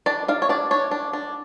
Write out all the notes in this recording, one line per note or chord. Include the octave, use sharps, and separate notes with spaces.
D4 D5
D4 F5
C#5
D4 D5
D4 C#5
D4
D4